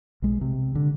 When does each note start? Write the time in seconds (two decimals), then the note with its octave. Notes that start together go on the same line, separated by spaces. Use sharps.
0.22 B1 G#3
0.41 C3
0.75 D3